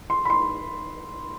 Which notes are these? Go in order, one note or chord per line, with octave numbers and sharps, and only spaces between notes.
C6
B5
C6